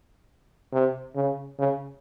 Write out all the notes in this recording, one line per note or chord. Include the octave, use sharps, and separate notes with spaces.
C3
C#3
C#3